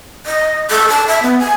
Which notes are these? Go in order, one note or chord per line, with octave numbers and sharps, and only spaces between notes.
D#5
A4
A5
E5
B3
G#5